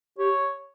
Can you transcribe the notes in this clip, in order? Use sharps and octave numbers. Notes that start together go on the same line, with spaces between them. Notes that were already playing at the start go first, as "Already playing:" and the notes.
G4 C#5